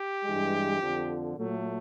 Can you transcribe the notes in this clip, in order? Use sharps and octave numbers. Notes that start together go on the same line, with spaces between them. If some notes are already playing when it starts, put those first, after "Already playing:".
Already playing: G4
G2 E3 G#3
F2 D3 F3
A#2 F#3 A3